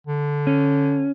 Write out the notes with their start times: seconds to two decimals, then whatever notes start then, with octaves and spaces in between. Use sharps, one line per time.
0.07 D3
0.47 C#4